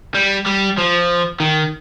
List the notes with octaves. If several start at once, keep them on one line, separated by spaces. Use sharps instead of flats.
G3
G3
F3
D#3